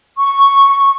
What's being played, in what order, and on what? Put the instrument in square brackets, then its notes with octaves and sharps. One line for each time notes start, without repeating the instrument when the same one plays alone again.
[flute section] C#6